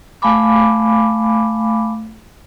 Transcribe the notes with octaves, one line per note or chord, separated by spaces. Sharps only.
A3 F5 G#5 B5 D6